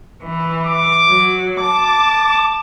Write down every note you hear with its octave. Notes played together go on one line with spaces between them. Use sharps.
E3
D6
F#3
A5 D6